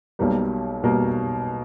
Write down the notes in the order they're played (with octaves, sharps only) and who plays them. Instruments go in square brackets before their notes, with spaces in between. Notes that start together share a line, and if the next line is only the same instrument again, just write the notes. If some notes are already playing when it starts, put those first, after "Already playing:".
[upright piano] B1 B2 G3 A#3
B2 G3 A#3